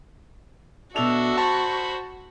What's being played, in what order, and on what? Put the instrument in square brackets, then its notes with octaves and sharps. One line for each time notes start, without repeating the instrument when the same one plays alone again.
[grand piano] B2 F7 [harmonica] D4 A4 E5 [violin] F#4
[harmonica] C5 B5 C#6 [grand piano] A5